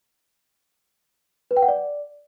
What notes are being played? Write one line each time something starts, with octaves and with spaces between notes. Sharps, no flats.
B4
G5
F#5
D5